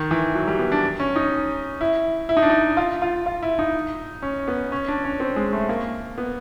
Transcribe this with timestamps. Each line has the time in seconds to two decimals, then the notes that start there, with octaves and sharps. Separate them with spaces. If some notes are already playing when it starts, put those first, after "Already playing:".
Already playing: D#3
0.11 E3
0.35 F#3
0.47 G3
0.59 B3
0.72 D4
1.00 C#4
1.16 D#4
1.81 E4
2.29 E4
2.37 D#4
2.42 D4
2.50 D#4
2.77 F4
3.02 F4
3.26 F4
3.43 E4
3.59 D#4
4.22 C#4
4.48 B3
4.72 C#4
4.88 D4
5.04 C#4
5.20 C4
5.36 G#3
5.53 A3
5.69 A#3
6.18 B3